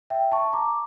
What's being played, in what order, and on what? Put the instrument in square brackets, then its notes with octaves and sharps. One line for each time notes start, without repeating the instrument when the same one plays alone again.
[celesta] E5 G5
A5 C#6
A#5 D6